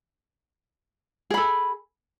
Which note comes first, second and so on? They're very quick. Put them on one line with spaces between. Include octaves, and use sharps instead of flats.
G#4 B5 A4